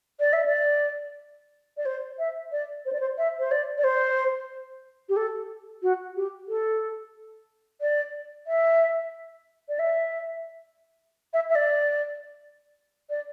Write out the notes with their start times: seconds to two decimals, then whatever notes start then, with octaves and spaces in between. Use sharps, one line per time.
0.20 D5
0.33 E5
0.46 D5
1.77 D5
1.85 C5
2.19 E5
2.52 D5
2.85 C5
2.92 D5
3.00 C5
3.18 E5
3.39 C5
3.51 D5
3.78 D5
3.84 C5
5.09 G4
5.16 A4
5.83 F#4
6.16 G4
6.48 A4
7.81 D5
8.47 E5
9.69 D5
9.79 E5
11.33 E5
11.50 E5
11.55 D5
13.10 D5